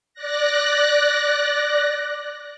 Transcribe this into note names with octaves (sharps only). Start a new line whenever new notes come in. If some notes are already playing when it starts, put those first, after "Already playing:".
D5 F#6 A#6